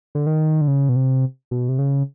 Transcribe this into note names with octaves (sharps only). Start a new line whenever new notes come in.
D3
D#3
D3
C#3
B2
C3
B2
C3
C#3